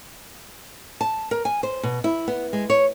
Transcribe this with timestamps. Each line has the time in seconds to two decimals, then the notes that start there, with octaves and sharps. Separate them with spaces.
1.01 A5
1.31 A#4
1.45 G#5
1.63 C5
1.83 B2
2.04 E4
2.28 B3
2.53 G#3
2.70 C#5